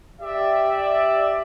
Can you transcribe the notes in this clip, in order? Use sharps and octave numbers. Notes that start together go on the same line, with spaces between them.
G4 D5 E5